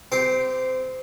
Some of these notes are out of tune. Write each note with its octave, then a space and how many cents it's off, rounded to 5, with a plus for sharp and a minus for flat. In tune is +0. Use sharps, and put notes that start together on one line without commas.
C4 -25 G4 +0 C6 +0